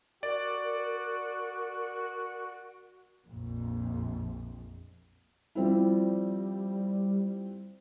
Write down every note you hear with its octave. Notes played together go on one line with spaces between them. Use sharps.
F#4 A#4 D5
A#1 F2
F3 G3 C4 E4